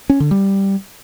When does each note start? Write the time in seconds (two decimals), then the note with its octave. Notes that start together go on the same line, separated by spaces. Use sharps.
0.10 C#4
0.20 D3
0.31 G3